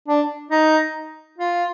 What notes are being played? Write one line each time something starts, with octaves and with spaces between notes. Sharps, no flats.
D4
D#4
F4